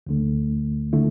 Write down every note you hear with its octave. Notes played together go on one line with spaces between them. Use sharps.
D2 D3 A3
D3 A3 E4